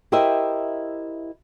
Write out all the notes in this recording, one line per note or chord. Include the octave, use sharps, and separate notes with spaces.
E4 G4 A#4 C5 D#5 E5